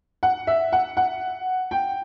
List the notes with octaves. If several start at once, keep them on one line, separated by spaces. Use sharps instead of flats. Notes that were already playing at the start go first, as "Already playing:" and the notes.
F#5
E5
F#5
F#5
G5